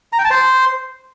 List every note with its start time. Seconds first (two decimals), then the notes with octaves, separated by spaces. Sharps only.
0.13 A#5
0.19 G5
0.25 A5
0.31 C5